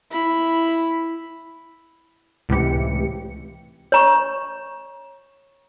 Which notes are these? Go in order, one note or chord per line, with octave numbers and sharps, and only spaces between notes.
E4 B5
C#2 A2 C3 E3 G4 C#7
C#5 A#5 C#6